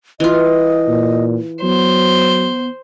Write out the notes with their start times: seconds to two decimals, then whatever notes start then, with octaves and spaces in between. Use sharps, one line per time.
0.20 E3 F4 D#5
0.88 A#2
1.62 F#3 B3 C5